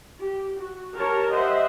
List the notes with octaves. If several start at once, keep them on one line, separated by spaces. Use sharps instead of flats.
G4
F#4
G4 A#4 C#5 A5 A#5
G4 C5 D#5 E5 F#5